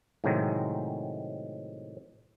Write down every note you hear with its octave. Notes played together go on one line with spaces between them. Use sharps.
A2 C3 D#3 F#3 G#3